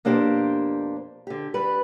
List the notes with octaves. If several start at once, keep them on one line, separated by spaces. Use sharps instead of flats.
F2 B2 A#3 D4 G4 C5
D3 G4
G3 B4